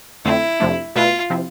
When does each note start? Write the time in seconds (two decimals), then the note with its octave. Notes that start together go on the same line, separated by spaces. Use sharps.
0.25 F2 D3 A3 C4 E4
0.60 F2 C3 F3 A3 D4
0.96 B2 A3 E4 F4 B4 E5
1.30 C3 F3 C4 E4